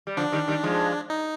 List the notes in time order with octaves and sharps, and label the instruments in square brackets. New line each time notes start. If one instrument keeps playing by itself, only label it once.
[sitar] G3
[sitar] D3 F3 [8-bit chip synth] D4
[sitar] D#3 G3
D#3 G3
F3 G#3
[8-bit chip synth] D#4